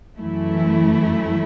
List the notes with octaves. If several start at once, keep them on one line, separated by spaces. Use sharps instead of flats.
F#2 E3 A3 E4